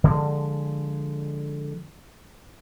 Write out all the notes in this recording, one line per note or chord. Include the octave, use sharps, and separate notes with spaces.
D3 F3 G#3